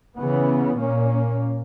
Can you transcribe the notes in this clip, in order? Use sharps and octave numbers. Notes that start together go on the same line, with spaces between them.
C#3 E3 B3
A#2 A#3 C#4